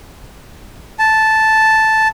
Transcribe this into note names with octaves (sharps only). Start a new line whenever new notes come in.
A5